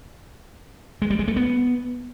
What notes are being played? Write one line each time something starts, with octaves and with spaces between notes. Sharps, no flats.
G#3
G3
G#3
A3
B3